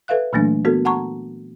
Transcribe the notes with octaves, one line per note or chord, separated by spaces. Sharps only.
A4 B4 E5 F5 F#6
A#2 E3 F#3 A3 A#3 D4
B3 F#4 A4 A#4
F#5 A5 A#5 C#6